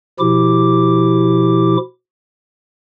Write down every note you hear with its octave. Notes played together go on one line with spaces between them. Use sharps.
B2 F3 E4 G4 D6